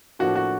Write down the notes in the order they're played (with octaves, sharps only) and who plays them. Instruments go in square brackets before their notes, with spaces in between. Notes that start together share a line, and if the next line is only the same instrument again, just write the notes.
[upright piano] A2 F3 A#3 D4 [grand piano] F#4
[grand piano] F#4